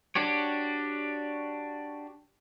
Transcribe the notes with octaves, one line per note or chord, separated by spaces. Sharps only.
D4 F#4 G4 C#5